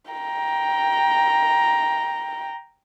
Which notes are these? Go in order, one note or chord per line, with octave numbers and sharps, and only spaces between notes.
G5 A#5